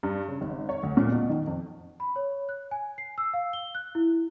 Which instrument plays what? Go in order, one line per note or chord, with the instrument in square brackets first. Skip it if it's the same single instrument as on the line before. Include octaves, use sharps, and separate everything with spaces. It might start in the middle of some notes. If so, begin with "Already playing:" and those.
[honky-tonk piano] G2
C#3
G#1
C#5
D2
A#2
B2
D#3
F2
[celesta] B5
C#5
F#6
G#5
C7
E6
F5
G7
F#6
E4